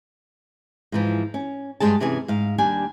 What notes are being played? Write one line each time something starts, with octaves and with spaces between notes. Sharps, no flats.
G#2 E3 F3
C#4
G2 A#2 G3 G#3 G#4 A5
C3 E3 C#4 G#4 G#5
G#2 F5
D#2 G3 D4 G#5